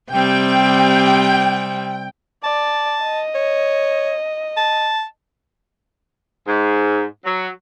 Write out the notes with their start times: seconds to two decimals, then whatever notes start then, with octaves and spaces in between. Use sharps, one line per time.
0.11 C3 G3 C4 G5
2.43 D5 A5
3.03 D#5
3.35 C#5
4.57 A5
6.47 G#2
7.25 F#3